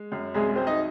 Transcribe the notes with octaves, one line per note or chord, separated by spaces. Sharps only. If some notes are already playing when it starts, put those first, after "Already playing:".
Already playing: G#3
F#2
C2 G#3 G#4
F#3 C4 C5
D#4 D#5